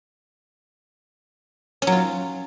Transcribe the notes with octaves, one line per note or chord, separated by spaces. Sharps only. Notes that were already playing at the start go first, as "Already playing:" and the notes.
C#4
F#3
F4